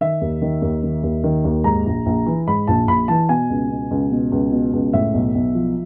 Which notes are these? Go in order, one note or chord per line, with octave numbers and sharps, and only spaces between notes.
D#3 E5
D#2
D#3
D#2
D#3
D#2
D#3
D#2
G#2 A#5
A#1
A#1
E3
G#2 B5
A#1 A5
A#1 B5
E3 A5
B2 G#5
C#2
B2
C#2
B2
C#2
B2
C#2
A2 E5
B1
B1
F3